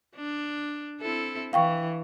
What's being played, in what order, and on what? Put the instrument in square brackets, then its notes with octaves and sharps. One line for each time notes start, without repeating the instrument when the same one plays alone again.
[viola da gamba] D4
C4 E4 A4
[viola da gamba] E3 [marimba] F5 G5 C#6